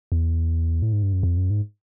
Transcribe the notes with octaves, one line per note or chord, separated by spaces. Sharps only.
E2
A2
G#2
G2
F#2
F2
F#2
G#2